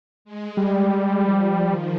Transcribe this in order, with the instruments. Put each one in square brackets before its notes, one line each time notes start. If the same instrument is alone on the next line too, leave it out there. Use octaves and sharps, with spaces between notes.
[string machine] G#3
[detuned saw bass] G3
[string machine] G#3
F3
D#3